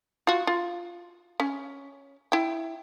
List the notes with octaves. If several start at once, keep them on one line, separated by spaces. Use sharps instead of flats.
F4 F#4
F4
C#4
E4 G5